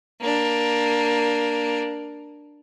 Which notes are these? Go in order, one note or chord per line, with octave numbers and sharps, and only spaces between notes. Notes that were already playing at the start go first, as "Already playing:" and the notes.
A#3 D4